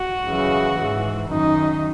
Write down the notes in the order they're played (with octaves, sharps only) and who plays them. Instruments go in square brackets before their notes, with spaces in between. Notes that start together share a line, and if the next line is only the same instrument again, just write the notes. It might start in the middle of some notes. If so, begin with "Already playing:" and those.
Already playing: [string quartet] F#4
F#2 C#3 E3
G#2 E3
F#2 D#3 D#4